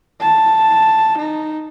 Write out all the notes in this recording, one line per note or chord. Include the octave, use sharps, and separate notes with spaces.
A5
D#4